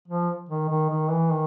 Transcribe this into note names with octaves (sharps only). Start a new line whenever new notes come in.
F3
D#3
D#3
D#3
E3
D#3